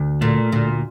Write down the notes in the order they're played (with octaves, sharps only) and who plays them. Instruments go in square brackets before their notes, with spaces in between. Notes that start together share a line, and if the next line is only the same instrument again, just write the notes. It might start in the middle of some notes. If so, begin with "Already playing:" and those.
Already playing: [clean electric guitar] D2
[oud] A#2 [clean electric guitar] A3
[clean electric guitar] D2 [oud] A#2